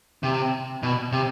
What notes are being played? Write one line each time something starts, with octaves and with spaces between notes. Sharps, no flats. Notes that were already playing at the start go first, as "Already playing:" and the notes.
C3
B2
C3